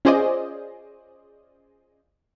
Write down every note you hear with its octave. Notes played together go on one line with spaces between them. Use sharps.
C#4 F4 G#4 C5 D5 D#5